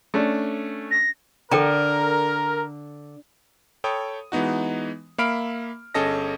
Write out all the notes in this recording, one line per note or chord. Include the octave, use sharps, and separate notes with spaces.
A3 C#4 D4
A#6
D3 A4 A#4 G5 A#5
A4 C#5 G5 B5 D#6
E3 G#3 B3 D#4 F#4
A#3 E5 F5 B5 F6 D7
G1 C#4 G#4 A4 D#5 A#6